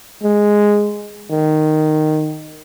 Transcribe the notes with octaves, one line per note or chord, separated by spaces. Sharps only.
G#3
D#3